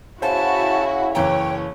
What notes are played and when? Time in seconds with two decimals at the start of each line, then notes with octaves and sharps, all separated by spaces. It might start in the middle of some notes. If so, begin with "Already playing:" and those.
0.22 C#3 E4 F#4 C5 A5
1.15 F#1 E3 C#5 G5 A#5